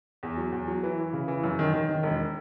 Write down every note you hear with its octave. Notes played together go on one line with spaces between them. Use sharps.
E2
F#3
E2
F#3
E3
E3
C#3
E3
F#2
D#3
D#3
D#3
E1